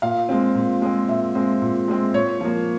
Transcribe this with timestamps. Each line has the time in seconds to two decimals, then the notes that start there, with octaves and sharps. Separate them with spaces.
0.02 A#2 F5
0.29 G#3 C4
0.55 A#2
0.82 G#3 C4
1.08 A#2 E5
1.35 G#3 C4
1.62 A#2
1.88 G#3 C4
2.14 A#2 C#5
2.41 F3 A#3